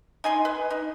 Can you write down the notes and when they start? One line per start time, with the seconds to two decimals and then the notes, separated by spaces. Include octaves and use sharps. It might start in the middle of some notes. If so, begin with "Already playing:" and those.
0.24 D#4 G#5 C6
0.45 B4
0.70 D#4